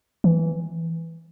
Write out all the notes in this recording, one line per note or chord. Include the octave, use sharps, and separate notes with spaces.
E3